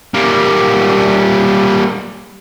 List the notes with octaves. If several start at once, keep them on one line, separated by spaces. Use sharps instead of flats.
G3 A#3